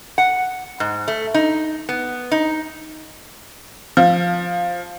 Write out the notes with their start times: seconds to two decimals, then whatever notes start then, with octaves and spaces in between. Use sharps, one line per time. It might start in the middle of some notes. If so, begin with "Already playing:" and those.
0.18 F#5
0.80 G#2
1.08 A3
1.34 D#4
1.89 B3
2.32 D#4
3.97 F3